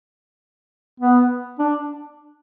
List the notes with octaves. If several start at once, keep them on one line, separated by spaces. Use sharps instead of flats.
B3
D4